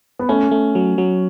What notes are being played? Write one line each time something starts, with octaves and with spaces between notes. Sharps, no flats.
B3
A3 C#4
A3
F#3
F#3